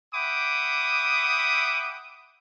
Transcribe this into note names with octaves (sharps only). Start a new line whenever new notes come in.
E5 F#5 G5 B5 D6 D#6